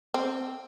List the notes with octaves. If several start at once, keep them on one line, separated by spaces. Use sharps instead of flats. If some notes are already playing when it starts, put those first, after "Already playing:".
C4